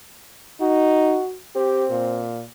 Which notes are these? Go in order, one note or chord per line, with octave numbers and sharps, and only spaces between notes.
D#4 F#4
C4 G4
A#2